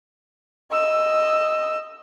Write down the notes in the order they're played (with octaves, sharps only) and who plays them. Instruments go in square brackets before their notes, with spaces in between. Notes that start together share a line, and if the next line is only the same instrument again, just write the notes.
[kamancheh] D#5 E6